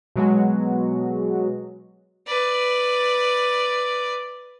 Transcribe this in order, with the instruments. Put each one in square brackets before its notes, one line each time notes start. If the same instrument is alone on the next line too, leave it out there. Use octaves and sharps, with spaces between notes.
[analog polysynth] B2 F#3 G#3 F#4
[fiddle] B4 D5